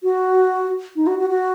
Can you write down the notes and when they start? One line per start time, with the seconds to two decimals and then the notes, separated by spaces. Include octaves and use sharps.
0.03 F#4
0.96 D#4
1.07 F#4
1.19 F#4
1.30 F#4